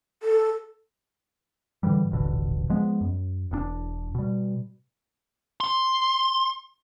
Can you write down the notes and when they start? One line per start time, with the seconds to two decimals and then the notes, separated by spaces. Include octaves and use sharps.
0.23 A4
1.83 G#2 D3 E3 G3
2.11 D#1 A1 B2 D3
2.69 F3 G#3 B3
3.01 F#2
3.51 E1 B2 D4
4.15 B2 G3
5.61 C6